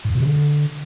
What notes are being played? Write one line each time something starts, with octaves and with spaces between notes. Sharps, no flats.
G#2
F2
B2
C#3
D3